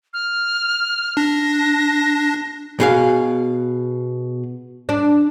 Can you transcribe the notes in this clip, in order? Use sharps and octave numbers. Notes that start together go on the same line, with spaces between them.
F6
D4 A#6
B2 G#4 F5
D4